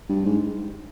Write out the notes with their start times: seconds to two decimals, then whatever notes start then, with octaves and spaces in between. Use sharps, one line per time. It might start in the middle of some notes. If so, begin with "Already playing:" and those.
0.09 G2
0.26 G#2